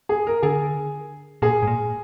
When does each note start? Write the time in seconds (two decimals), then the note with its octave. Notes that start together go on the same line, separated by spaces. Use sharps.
0.09 G#4
0.27 A#4
0.43 D3 G#4
1.42 A#2 G#4
1.63 G#2
1.67 A#2